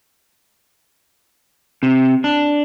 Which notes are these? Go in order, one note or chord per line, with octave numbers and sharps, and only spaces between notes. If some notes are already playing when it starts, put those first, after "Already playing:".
C3
D4